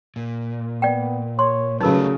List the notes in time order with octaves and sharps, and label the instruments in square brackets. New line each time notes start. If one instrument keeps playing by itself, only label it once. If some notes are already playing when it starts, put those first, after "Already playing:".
[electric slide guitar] A#2
[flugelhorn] B3 [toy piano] D5 G5
[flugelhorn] C#5 [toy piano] C6
[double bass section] C#3 F#3 [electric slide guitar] G3 A3 [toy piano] D#4 A#4 [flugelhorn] B4